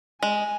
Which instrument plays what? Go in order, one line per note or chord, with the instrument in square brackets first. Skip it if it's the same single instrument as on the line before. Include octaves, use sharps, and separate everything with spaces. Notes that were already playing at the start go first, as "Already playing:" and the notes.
[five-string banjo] G#3 [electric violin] G#5